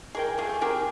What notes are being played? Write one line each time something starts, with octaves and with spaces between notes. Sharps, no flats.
G#4 A#4 G5
A3 F4 G#4
C4 G4 G#4 A#4